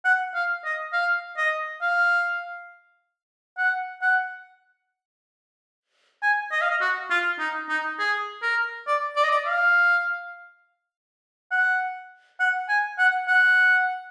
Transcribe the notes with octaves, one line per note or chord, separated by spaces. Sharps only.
F#5
F5
D#5
F5
D#5
F5
F#5
F#5
G#5
D#5
F5
D#5
F#4
F4
D#4
D#4
G#4
A#4
D5
D5
D#5
D5
F5
F#5
F#5
G#5
F#5
F#5